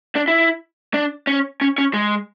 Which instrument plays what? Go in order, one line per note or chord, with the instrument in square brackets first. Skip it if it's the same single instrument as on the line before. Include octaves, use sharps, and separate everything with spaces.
[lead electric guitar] D4
E4
D4
C#4
C#4
C#4
G#3